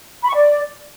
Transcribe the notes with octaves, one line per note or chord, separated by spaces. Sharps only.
B5
C#6
D5